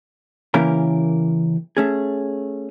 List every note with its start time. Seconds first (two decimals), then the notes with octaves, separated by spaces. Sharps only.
0.54 C#3 E3 A#3 C#4 G4 A#4
1.77 A3 C#4 G#4